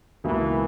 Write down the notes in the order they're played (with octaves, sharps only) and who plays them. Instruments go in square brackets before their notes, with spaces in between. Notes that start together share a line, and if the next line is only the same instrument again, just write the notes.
[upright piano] C#2 B2 A#3 [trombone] E3